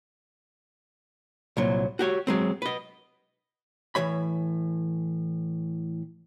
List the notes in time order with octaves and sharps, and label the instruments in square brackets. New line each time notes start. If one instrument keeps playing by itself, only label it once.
[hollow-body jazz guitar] C2 A#2 F#3
F#4 G4 C#5
F#3 G#3 C4
B4 D#5
A2 E3 F3 C#5 B5